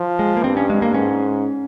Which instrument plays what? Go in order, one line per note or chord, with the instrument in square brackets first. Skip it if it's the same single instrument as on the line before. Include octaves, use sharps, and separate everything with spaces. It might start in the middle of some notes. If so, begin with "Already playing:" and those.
Already playing: [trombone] F3
[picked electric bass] G#3
A#3
[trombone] G2 [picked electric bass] C4
[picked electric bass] C#4
G#3
A#3
[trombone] G#2 [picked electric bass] C#4